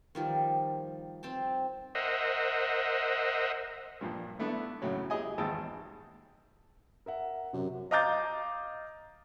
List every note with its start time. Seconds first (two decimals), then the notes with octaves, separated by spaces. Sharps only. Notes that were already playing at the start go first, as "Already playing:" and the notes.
0.15 D#3 F3 G3
1.23 C4 G5 A5
1.95 A#4 C5 D#5 E5 F#5
4.01 G2 A#2 F3
4.39 A3 B3 D4 E4 A4
4.82 F#2 A2 C#3 F#3 C#4
5.10 E4 G4 G#4 D#5 G#5
5.38 G#1 E2 G#3 G5 A5 E6
7.06 A#4 E5 F#5
7.53 F#2 C3
7.91 D#5 F5 A#5 D6 G6 A6